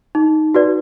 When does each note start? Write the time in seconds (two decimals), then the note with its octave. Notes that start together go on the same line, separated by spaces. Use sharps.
0.15 D#4
0.54 F#4 B4 D5